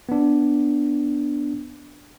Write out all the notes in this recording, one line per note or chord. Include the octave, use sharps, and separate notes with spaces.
B3 D4